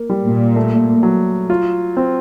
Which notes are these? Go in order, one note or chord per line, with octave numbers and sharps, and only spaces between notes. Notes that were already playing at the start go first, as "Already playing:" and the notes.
Already playing: A#3
G3
A#2
A3
F#3
F4
C4